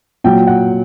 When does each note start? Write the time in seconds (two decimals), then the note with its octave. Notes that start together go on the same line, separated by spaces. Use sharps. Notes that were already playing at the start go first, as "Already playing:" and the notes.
0.24 A#2 F#3 G5
0.47 F#5